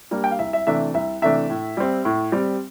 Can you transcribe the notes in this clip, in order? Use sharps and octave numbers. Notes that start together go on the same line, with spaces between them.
G3 A#3 D4
G5
F5
C2 E5
E5
C3 E3 A3 D4 E5
C2 E5
C3 E3 A3 D4 E5
A2
G3 C4
A2
G3 C4